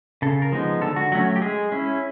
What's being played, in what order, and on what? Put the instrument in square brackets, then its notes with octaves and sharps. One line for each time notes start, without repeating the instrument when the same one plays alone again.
[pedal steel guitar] C#3 A4
A#4
F3 G#3 B3 D#4
D3 A4
F#4
F#3 A3 C#4 F#4
G4
G#3 G#4
C#4 E4